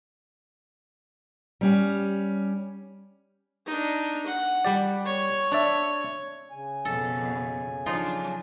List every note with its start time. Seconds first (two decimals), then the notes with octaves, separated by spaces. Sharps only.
1.61 G3 C#4 G4
3.66 D4 D#4
4.26 F#5
4.65 G3 G4 D5
5.05 C#5
5.52 D4 D5 E5
6.51 C#3 G#5
6.85 F2 B2 A4
7.86 F3 F#3 D4 D#4 F4